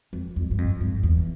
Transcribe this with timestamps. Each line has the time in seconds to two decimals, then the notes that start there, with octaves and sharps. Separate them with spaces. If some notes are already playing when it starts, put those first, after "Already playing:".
0.13 F2
0.36 F2
0.51 G2
0.58 F2
0.81 G2
1.03 E2